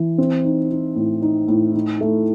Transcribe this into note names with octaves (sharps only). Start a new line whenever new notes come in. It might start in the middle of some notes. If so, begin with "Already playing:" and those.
Already playing: E3
C4
D#4
D#4
A2
D#4
A2
D#4
A3